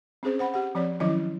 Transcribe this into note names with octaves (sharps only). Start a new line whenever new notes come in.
C4 C#4 G#4 C5
C5 F#5 B5
G4 F#5
F3 C4 C#5 D5
D#3 F3 F#3 C#4 E4 D#5